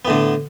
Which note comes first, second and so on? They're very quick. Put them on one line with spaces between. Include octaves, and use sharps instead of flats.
B3 A2 D3